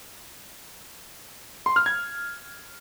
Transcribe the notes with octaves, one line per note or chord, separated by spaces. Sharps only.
C6
F6
G#6